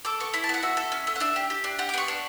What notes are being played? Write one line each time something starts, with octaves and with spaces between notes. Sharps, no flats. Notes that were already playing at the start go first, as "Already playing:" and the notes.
A4 D6
B3 C#6
E4 B5
A5
B3 F#5
F#4 E5
A4
C#4
A3
F#5
D4 E5
G4
G4
D4
G4 F#5
D6
B3 C#6
D4